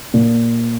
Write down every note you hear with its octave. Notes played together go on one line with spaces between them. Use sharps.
A#2